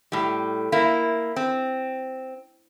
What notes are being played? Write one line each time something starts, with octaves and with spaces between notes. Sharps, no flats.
A2 G3
A#3 E4
C4